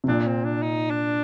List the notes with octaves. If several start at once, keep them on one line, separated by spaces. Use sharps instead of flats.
C3
A#2 D4
C4
D4
D#4
D4